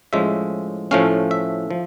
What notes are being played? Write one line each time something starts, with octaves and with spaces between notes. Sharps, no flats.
A2 F3 G#3 C#4 E5
A2 F3 A3 C#4 F5
E5
F3